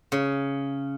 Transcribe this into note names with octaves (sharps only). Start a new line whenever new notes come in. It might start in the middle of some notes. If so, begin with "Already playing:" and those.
C#3